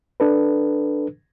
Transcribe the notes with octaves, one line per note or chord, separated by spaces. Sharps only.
D4 A4 B4